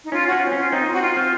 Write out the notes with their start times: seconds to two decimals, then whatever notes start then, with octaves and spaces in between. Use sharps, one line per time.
0.04 D#4
0.12 C#4 F4
0.28 C#4 F#4
0.47 C4
0.52 C#4
0.57 F4
0.71 C4 D#4
0.87 C4
0.93 F#4
1.02 F4
1.17 C4